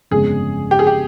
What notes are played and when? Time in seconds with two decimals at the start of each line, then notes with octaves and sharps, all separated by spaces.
0.11 G1 F2 C#3 G#3 G#4
0.71 G4
0.79 G#4
0.87 G4